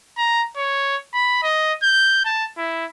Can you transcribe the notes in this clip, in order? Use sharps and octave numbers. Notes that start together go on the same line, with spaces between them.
A#5
C#5
B5
D#5
G6
A5
E4